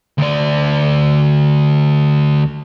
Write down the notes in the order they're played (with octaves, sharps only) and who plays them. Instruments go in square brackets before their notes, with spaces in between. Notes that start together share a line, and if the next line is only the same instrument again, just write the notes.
[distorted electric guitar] D2 D5